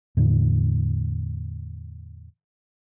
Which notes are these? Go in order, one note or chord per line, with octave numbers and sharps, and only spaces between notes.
E2 A2 D3